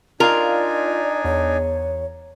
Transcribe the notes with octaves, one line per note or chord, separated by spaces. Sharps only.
D4 D#4 F4 A#4 D5 F5 G#5
E2 C#5